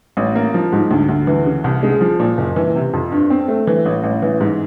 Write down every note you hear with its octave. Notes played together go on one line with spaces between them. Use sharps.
A1
A#3
F3
G#2
D2
D2
E3
C#3
C2
G#3
F3
A#2
F#1
E3
C3
F2
G2
C4
A3
E3
A1
A1
E3
G#2